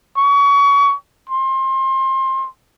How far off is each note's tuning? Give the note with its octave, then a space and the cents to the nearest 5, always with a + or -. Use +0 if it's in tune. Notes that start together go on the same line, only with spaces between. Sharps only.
C#6 +30
C6 +25